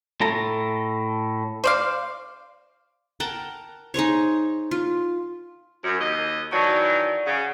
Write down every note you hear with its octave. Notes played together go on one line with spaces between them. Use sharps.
A2 A4 A#5
C5 D5 F5
A#4 F#5 G5 A5
D#4 G#4 C5 C#5
F4
F#2
D#2 D#5
D#3 E3 F#3 D5 A5 C#6
D5
C#3 F#5